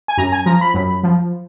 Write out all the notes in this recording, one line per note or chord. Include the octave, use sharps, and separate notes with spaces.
G#5
F#2 A#5
G#5
F3 A#5
B5
F#2
F3